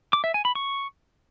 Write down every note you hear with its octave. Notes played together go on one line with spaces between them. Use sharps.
D6
E5
G#5
B5
C#6